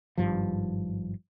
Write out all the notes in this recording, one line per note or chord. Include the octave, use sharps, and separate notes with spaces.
G#1 G2 F3